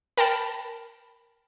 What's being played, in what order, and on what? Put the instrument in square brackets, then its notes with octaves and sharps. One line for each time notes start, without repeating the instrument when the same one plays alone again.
[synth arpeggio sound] A#4 G5 A5 B5